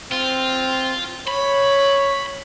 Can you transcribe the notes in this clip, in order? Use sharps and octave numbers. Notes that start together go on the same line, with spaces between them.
C4 F4
C#5 B5